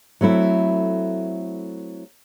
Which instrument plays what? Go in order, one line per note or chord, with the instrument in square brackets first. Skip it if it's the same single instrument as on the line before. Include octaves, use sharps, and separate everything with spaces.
[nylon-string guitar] F#3 A3 C4 E4